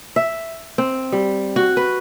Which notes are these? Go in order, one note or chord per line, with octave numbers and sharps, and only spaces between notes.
E5
C4
G3
F#4
B4